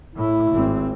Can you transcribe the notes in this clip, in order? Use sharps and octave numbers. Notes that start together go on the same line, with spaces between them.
A2 E4
G#1 C4